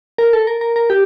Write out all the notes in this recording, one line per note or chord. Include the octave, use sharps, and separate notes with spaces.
A#4
A4
A#4
A#4
A#4
G4